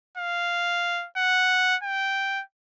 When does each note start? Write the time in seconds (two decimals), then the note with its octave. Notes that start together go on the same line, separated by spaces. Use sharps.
0.18 F5
1.17 F#5
1.83 G5